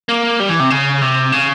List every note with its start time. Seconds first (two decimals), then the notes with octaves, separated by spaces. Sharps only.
0.09 A#3
0.40 G3
0.49 E3
0.60 C3
0.70 C#3
1.02 C3
1.32 C#3